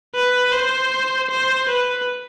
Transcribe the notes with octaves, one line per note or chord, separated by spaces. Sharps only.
B4
C5
C5
B4